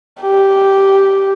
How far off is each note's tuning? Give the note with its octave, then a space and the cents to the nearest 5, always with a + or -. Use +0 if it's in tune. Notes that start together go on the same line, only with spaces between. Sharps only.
G4 -5